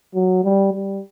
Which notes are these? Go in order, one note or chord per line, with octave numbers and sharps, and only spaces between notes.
F#3
G3
G3